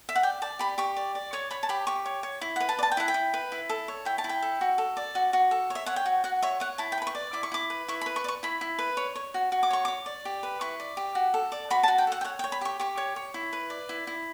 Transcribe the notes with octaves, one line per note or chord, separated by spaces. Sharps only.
E5
F#5
D5 G5
D5 A5
G4 B5
G4 C#6
D5
D5
C#5 C#6
C#5 B5
A5
G4 B5
G4 C#6
C#5
C#5
E4
F#5
B4
A5
D5
A5
G5
E4 F#5
G5
E4
B4
E4
A4
C#5
E4 G5
A5
E4
G5
A4
F#4
A4
D5
F#4
F#4
A4
C#5
E5
C#5 F#5
G5
F#4
F#4 F#5
C#5 E5
C#5 F#5
E4 A5
G5
B4 B5
C#6
D5
E4 D6
C#6
E4 D6
B4
E4 C#6
B5
B4
C#6
D5
C#6
E4 B5
E4
B4
C#5
C#5
F#4
F#4
D6
C#5 C#6
C#5 D6
D5
G4
B4
E4 C#6
D5
G4
F#4
A4
D5
F#4 B5
A5
F#4
G5
A4 F#5
G5
C#5 F#5
G5
C#5
B5
G4 C#6
G4 C#6
C#5
C#5
E4
B4
D5
E4
E4